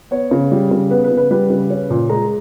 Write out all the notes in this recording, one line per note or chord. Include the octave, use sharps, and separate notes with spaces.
B3 C#5
C#3
G3
C#3
B3 B4
B4
C#3
B4
G3 B4
C#3
C#4
A#2
G#3 A#5